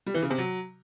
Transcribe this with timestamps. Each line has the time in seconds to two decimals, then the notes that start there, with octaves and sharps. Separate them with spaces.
0.06 G3
0.14 E3
0.22 C#3
0.30 C3
0.38 F#3